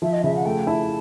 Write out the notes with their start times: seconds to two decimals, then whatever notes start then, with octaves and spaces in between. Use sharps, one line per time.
0.02 F3 E5
0.12 D#5
0.23 C#3 E5
0.35 F#5
0.45 A3 G5
0.67 E4 A5